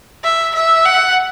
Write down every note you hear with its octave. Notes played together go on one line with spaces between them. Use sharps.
E5
E5
F#5